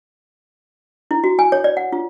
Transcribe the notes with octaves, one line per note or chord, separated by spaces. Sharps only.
E4
F#4
G#5
C#5
D5
F#5
F4